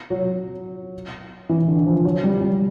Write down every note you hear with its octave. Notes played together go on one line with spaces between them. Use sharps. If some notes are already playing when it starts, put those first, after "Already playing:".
F#3
E3
D3
F3
F#3
G3
G3